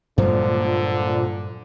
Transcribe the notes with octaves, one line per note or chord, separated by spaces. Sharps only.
G2 A#2 D3 F3 F#3 G#3